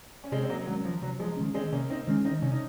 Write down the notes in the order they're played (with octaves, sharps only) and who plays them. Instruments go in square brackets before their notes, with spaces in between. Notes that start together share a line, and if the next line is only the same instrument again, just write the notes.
[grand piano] C#4
[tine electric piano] C3 [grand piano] G#3 C4
[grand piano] C4
F#3 A#3
[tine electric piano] D#3 G#3 C#4 [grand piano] F#3
[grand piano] F3
[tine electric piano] C3 [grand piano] F#3
[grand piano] F3 G#3
[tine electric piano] D#3 G#3 C#4
[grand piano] G#3 C4
[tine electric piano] C3 [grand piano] A#3 C#4
[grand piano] C4 D#4
[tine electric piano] D#3 G#3 C#4
[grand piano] C4 D#4
[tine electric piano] C3 [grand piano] C#4
[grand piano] D#4